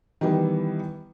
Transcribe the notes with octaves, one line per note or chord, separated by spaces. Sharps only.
D#3 E3 G3 B3